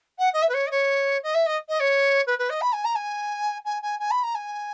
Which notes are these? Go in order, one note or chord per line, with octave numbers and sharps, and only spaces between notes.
F#5
D#5
E5
B4
C#5
D#5
C#5
D#5
E5
D#5
D#5
C#5
B4
B4
D#5
B5
G#5
A#5
G#5
G#5
G#5
G#5
B5
A#5
G#5